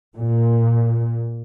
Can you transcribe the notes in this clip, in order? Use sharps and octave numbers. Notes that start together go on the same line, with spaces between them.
A#2